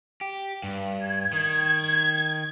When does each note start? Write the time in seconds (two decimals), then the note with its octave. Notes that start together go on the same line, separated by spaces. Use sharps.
0.21 G4
0.63 G2
0.98 G#6
1.33 D#3